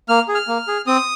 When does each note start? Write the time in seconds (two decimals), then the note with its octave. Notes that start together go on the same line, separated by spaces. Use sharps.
0.09 A#3 F6
0.28 G#4
0.35 F6
0.48 A#3
0.68 G#4
0.87 C4 D#6